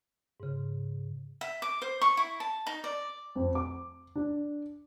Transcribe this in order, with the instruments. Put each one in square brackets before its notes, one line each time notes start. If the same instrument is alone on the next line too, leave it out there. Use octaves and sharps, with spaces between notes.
[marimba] G#2 C#3
[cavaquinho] E5
D6
C5
C#6
E4
A5
D#4
D5
[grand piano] F2
D6
D4